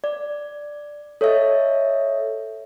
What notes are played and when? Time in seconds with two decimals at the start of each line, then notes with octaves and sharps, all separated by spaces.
0.04 D5
1.21 A4 C#5 D#5 E5